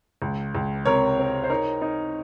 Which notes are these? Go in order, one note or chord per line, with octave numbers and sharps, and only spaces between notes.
C#2
C#2
C3 A#4 C#5
C4
C5
D#4 A#4 C#5
D#4